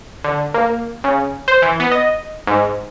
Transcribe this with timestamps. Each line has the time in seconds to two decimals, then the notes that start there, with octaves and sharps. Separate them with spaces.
0.24 D3
0.54 A#3
1.04 C#3
1.48 C5
1.62 E3
1.80 B3
1.91 D#5
2.47 G#2